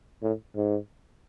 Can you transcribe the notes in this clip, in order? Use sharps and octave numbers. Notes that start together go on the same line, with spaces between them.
A2
G#2